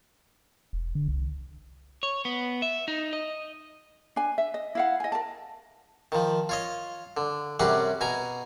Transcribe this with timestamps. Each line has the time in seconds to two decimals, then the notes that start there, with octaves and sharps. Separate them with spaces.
0.73 E1
0.95 D3
1.08 C2
2.03 C#5
2.25 B3
2.62 E5
2.88 D#4
3.13 D#5
4.16 D4 G#5
4.38 E5
4.54 D#5
4.75 E4 F5 F#5
5.00 D#5 G#5
5.12 A#4 A5
6.12 D#3 F3
6.49 F4 C#5 D#5
7.17 D3
7.60 F#2 C3 G3 C#4 G#4 F#5
8.01 B2 G#5 A#5